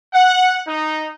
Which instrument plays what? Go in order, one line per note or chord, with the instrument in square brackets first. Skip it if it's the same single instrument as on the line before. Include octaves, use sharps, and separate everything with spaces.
[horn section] F#5
D#4